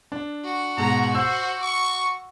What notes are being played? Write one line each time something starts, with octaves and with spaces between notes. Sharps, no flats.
D4
F#4
G#2 B2 A#5
C5 E6
C#6